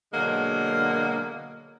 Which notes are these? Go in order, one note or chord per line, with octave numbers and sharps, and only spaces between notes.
B2 D3 F#3 G#3 A#3